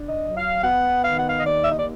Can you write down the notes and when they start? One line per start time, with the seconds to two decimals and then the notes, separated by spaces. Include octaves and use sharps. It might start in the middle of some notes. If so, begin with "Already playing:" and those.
Already playing: D4
0.09 D#5
0.23 F#3
0.37 F5
0.63 B3 F#5
1.04 D#3 F5
1.17 F#5
1.29 F5
1.38 D#5
1.45 D#2 D5
1.65 E5
1.72 D#5
1.79 D5